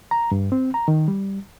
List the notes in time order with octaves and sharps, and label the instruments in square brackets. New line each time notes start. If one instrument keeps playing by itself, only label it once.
[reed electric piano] A#5
G2
C4
A#5
D#3
G3